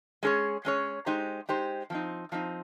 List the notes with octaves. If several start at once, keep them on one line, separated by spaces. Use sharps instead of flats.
G#3 C#4 G#4 C#5
G#3 C#4 G#4 C#5
G#3 D#4 G4 C5
G#3 D#4 G4 C5
F3 C4 D#4
F3 C4 D#4